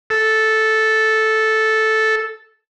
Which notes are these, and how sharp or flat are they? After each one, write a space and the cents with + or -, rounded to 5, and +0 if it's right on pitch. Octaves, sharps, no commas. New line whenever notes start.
A4 -5